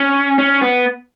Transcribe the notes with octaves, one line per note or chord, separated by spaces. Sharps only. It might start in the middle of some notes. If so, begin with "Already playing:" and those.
Already playing: C#4
C#4
B3